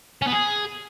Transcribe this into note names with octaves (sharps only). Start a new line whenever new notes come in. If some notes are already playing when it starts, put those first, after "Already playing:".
C#4
B3
G#4